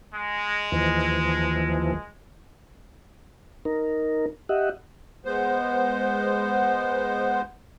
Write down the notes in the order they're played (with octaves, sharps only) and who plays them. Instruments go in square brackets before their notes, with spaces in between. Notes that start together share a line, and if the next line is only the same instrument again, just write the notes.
[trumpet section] G#3
[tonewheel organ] D#2 E3 F3
D#4 A#4
G4 D#5 E5 F#5
[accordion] G#3 B3 C5